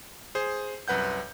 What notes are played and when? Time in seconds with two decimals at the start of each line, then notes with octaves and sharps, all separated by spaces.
0.35 G#4 C5
0.88 C2 F#2 B4 F#5 G6